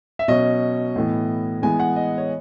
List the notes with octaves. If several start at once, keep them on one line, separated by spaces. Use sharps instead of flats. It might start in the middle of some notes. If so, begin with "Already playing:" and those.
E5
B2 F#3 C#4 D#5
A2 E3 B3
E3 G#3 B3 G#5
F#5
D#5
C#5